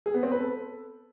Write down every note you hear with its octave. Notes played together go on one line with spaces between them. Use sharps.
G#4
B3
C4
B4
A4